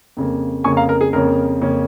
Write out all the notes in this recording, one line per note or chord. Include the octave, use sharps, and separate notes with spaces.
F2 C#3 A#3
F2 C#3 A#3 G#5 C#6
F5 A#5
A#4
G#4
F2 C#3 A#3 C#4 A#4
F2 C#3 A#3 C#4